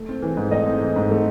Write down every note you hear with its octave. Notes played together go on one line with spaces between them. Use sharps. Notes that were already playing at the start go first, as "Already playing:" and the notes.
Already playing: A3
C4
E3
G#2
A3 D#4 D#5
C4
E3
G#2
A3